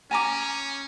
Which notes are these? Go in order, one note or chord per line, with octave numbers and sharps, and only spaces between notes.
C#4 G#5 A#5 D6